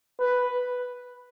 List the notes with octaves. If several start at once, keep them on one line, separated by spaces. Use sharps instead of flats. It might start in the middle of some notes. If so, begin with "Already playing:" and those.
B4